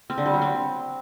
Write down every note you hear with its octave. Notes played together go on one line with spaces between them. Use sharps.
C4
D3
G3
F#3
C4